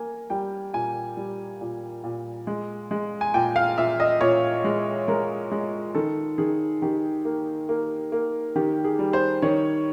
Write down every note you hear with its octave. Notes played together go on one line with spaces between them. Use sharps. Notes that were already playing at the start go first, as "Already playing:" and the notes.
Already playing: A#3 G#5
G3 G5
A#2 G#5
G3
A#2
A#2
G#3
G#3
G#5
A#2 G5
F5
A#2 E5
D#5
A#2 C#5
G#3
G#3 A#4
G#3
D#3 A4
D#3 G#4
D#3 G4
A#3
A#3
A#3
D#3 G4
G#4
G3
C5
D#3 C#5